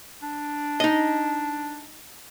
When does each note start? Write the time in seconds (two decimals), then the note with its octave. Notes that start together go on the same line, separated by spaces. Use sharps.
0.23 D4
0.80 D#4 D#5